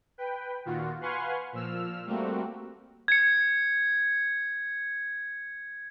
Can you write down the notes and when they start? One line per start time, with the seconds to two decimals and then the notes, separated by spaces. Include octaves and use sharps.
0.18 B4 G5
0.65 D#2 A#2 F4 F#4
1.01 B4 F5 F#5 G#5 C6 C#6
1.53 A#2 F3 E6 F6
2.06 G3 A3 A#3 C4 F#4
3.08 G#6 C#7